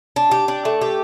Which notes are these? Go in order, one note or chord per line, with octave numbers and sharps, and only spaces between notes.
D4
G4
D4
A3
G4